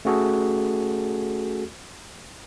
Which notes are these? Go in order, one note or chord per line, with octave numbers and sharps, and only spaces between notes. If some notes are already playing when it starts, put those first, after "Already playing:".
A3 C#4 F#4 G#4 A4